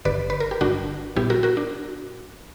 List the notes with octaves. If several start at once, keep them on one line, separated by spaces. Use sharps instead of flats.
G1 G2 D3 B4 D5
B4
A#4
G4
G1 G2 D3 D4 F#4
A#1 A#2 G3 B3 E4 G4
F#4 A#4
F#4 A#4
D4